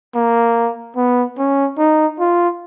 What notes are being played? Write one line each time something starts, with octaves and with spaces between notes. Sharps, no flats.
A#3
B3
C#4
D#4
F4